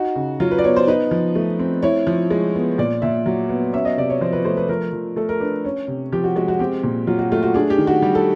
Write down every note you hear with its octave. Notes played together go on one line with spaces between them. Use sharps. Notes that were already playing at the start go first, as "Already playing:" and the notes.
Already playing: D#4 F#4
C#3
F#3 F4
B4
D5
B3 C#5
C5
D#4 B4
F3
A3
C4
E4 C#5
F3
G#3
B3
A#2 D5
A#2 E5
F#3
B3
C#4 E5
D#5
C3 D5
C#5
F3 C5
B4
A3 C5
B4
F3 A#4
F3
A3 A4
A#4
D4 B4
C#4
C3
F3 G4
F#4
G#3 F#4
F#4
C4 G4
A#2
F#3 F4
F#4
A3 F4
F#4
D4 G#4
G4
D#3
F#4
G3 G4
A4